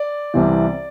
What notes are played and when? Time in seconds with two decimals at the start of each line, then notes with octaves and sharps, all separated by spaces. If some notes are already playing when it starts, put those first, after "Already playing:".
Already playing: D5
0.34 C2 C3 E3